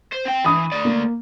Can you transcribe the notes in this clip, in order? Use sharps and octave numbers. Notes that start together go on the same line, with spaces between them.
C5
C4 G5
E3 B5 D#6
A3 D5
A#3